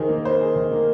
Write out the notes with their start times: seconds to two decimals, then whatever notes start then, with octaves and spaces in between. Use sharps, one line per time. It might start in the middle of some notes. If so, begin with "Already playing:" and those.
Already playing: D#3 G#4 C5
0.09 A#3
0.25 C5
0.41 G#4
0.56 D#3
0.71 A#3